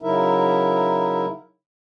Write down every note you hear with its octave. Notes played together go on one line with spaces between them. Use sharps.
C#3 F#3 D#4 E4 A#4 E5